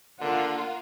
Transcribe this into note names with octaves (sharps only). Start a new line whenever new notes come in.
D3 A#3 F4 F#5